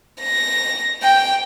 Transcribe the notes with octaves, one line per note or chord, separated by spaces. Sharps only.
A#6
G5